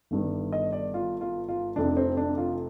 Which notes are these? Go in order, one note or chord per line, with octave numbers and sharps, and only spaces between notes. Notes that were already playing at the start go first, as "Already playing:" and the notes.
G1 G2 D#3 G3
D#5
D5
F4
F4
F4
F1 F2 C3 D4
C4
D4
F4